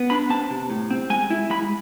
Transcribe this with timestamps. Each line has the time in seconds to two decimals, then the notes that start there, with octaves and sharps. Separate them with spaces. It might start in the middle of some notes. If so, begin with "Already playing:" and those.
Already playing: B3
0.10 D4 B5
0.30 C4 A5
0.50 C3
0.70 A2
0.90 C4
1.10 G#3 G#5
1.30 E4
1.50 G#3 B5